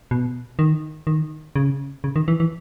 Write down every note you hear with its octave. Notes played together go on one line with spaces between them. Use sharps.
B2
D#3
D#3
C#3
C#3
D#3
E3
E3